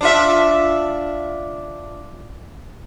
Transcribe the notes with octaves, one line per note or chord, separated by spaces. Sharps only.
D4 F4 E5